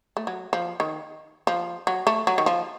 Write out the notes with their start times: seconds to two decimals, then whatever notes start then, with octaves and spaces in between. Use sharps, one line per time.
0.17 A3
0.27 F#3
0.53 F3
0.80 D#3
1.47 F3
1.87 F#3
2.07 A3
2.27 F#3
2.38 D#3
2.46 F3